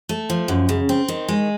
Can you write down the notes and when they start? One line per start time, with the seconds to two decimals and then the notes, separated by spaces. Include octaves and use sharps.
0.09 A3
0.30 F3
0.48 F#2
0.69 C#3
0.89 C4
1.08 D#3
1.28 G#3